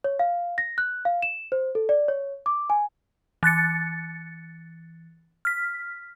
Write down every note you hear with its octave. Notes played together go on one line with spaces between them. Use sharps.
C#5
F5
A#6
F#6
F5
E7
C5
A4
D5
C#5
D6
G#5
E3 F#6 A6 C#7
F6 B6